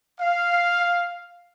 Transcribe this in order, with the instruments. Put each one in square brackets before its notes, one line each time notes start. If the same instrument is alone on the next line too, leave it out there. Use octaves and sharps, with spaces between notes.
[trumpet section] F5